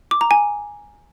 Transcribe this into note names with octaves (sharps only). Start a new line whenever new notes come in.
D6
A#5
G#5